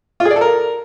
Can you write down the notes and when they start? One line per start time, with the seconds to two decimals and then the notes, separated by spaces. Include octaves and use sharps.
0.20 F4
0.25 G#4
0.31 D5
0.36 A4
0.41 A#4